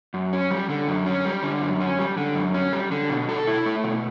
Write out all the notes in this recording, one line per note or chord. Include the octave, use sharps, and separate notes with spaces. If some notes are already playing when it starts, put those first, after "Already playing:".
F#2
C#4
G3
D3
F#2
C#4
G3
D3
F#2
C#4
G3
D3
F#2
C#4
G3
D3
B2
A4
E4
A3
B2